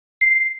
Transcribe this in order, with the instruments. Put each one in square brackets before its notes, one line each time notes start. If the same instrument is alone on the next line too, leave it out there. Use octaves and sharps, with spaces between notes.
[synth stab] C7